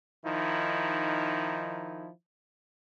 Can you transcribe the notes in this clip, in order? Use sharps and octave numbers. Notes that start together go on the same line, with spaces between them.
D#3 F3 D#4 E4